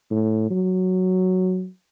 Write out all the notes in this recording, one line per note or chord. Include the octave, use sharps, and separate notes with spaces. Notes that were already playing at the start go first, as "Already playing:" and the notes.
A2
F#3